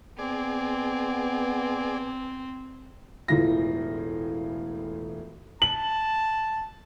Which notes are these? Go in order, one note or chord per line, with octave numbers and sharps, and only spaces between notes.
B3 C4 G#4 D5
E1 A2 E3 F4 A#6
A5 F#7